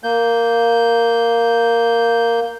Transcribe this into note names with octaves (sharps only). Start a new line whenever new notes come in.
A#3 G6